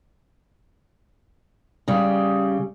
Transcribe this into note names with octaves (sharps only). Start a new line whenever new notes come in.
C#3 G3